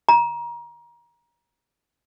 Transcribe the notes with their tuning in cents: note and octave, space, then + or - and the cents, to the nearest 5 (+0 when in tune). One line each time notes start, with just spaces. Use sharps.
A#5 +25